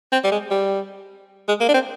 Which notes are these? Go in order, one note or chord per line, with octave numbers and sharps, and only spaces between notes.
C4
G3
G#3
G3
G#3
A#3
D4
C4